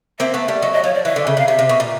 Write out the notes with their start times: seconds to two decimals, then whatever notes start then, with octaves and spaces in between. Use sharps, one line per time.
0.19 A#3 C4 E5
0.34 A3 B3
0.48 G3 A3
0.62 F#3 D#5
0.73 D#5
0.84 F3 C#5
0.94 D5
1.05 E3 E5
1.16 D3
1.27 C#3
1.37 C3 F5
1.48 C3 E5
1.59 C3
1.69 B2
1.80 A#2